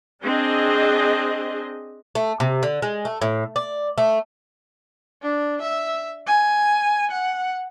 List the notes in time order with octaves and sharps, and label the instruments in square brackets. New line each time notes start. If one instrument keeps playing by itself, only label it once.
[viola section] C4 D4 G#4 D#5
[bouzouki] A3
C3
D3
G#3
A3
A2
D5
A3
[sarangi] D4
E5
G#5
F#5